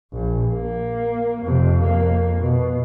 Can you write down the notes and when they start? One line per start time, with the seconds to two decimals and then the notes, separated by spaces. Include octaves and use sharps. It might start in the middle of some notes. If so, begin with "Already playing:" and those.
0.13 A#1
0.53 A#3
1.42 F2 C3
1.83 F2 A#3
2.39 B2